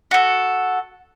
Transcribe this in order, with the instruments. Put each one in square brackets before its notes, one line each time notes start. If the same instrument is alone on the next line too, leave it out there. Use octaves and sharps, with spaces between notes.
[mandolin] F#4 A4